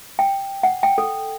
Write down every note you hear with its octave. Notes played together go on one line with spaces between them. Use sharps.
G5
F#5
G5
A4